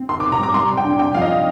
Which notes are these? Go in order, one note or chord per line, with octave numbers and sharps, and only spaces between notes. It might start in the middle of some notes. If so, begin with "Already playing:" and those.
Already playing: C4
D#3 C6
D6
C3
A#5
G3 D6
G3 C6
C3
G5
D4
C4 G5
F3 F5
D#5
D#4